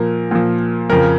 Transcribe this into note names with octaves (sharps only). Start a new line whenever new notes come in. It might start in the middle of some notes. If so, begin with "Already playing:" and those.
Already playing: A#2 F3 A#4
A#2 F3
F2 C#3 F3 A#4